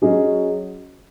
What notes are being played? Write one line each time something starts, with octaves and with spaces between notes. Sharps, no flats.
F#3 C#4 G#4 D#5